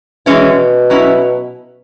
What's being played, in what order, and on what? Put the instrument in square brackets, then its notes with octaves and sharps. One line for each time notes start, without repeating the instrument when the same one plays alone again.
[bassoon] B2 [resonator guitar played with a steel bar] E3 G#3 C#4 E4
[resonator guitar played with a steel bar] F#3 C#4 E4